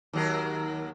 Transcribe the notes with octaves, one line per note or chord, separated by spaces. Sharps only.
D#2 F#3 A#4